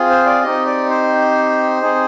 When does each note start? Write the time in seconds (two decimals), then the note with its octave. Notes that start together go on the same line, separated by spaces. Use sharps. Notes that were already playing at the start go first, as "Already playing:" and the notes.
Already playing: C4 F4 G#4
0.10 C5
0.26 D5
0.43 C4 D#4 G4 D#5
0.66 D5
0.90 C5
1.83 C4 D#4 G#4